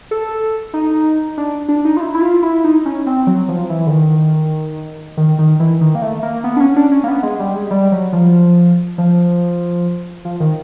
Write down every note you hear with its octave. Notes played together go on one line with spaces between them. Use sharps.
A4
D#4
D4
D4
D#4
F4
E4
E4
F4
E4
D#4
C#4
C4
F#3
F3
E3
D3
D#3
D#3
D#3
E3
D#3
A#3
A3
A#3
B3
D4
C#4
D4
C#4
A#3
B3
G#3
G3
G#3
G3
F#3
F3
F3
F3
D#3